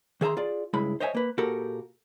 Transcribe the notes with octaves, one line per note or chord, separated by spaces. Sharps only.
D#3 G#4 E5 A#5 C6
F4 G#4 D5
C#2 G2 G#3 E4 B5
C5 C#5 D#5 E5 F#5 G#5
A#3 B4
A#2 F#4 G4 A4 A#4